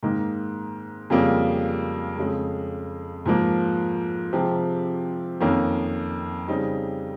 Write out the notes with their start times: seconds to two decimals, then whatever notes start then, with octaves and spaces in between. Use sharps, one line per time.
0.03 G#2 D#3 A#3 D#4
1.10 F2 C#3 G3 A#3 F4
2.18 F2 C#3 G#3
3.26 G#2 F3 A#3
4.33 C3 F3 G#3 C4 G4
5.41 F2 D#3 A#3 C#4
6.48 C#3 G3 C4 D#4